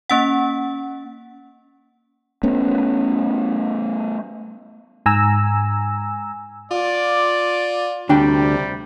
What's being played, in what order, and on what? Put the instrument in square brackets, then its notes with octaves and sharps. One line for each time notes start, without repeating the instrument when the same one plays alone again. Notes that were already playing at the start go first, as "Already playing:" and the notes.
[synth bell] A#3 C#4 F#5
[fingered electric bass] A3 B3 C#4
[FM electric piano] G#2 G#5 A#5 E6
[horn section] F4 D5
[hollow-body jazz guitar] D2 D4 G5 [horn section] C3 G3